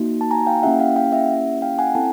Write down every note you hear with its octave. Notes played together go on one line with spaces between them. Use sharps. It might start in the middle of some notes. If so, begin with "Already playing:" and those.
Already playing: A#3 D#4 F#4
A5
G#5 A#5
F5 G5
A#3 C#4 E4 G4 E5 F#5
F5 G5
F5 G5
E5 F#5
F5 G5
F#5 G#5
C4 E4 A4 G5 A5